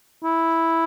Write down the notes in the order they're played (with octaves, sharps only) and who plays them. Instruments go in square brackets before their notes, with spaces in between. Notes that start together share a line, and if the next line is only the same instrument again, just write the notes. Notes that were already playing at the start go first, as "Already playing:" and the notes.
[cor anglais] E4